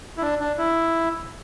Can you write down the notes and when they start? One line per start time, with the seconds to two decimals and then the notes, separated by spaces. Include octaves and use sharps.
0.18 E4
0.22 D4
0.40 D4
0.58 E4